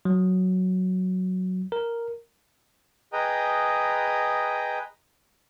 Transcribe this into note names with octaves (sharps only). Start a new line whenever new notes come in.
F#3
A#4
G#4 B4 D#5 G5 A#5 D#6